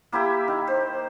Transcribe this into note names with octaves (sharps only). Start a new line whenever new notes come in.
A#3 E4 G4 E5
D#3
C5